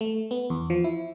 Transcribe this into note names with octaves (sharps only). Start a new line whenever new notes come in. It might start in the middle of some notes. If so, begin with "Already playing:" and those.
A3
B3
E2
F3
E4